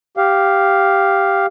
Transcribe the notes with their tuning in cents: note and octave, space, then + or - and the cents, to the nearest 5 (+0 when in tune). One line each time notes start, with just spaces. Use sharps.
G4 +0 F5 +0